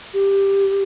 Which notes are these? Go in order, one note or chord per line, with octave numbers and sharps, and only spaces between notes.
G4